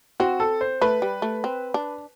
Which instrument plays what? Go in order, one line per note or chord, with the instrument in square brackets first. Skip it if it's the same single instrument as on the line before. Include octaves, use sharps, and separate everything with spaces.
[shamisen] C4 [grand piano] F#4
[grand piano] A4
C5
[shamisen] A3 [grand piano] B4
[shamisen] G3
A3
C4
D4